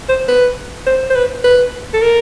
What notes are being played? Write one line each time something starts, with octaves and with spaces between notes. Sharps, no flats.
C5
B4
C5
C5
B4
B4
A4
A#4